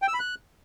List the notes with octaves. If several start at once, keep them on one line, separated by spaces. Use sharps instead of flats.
G5
E6
B5
F#6